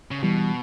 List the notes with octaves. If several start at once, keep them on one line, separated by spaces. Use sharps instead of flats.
C#3
B2 E3 G3